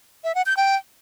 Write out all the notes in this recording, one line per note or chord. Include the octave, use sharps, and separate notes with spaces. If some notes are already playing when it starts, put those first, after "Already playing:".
E5
F#5
G6
G5